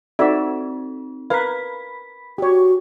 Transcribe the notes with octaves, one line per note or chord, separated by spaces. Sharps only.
C4 D#4 F#4 D5 E5
A#4 B4 F5 B5 B6
F#4 G4 C#5